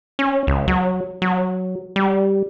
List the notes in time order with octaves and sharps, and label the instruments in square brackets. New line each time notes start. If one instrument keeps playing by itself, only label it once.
[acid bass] C#4
C#2
F#3
F#3
G3